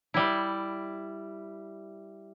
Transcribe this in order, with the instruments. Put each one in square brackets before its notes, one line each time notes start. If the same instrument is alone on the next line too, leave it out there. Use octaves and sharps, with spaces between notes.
[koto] G3 E4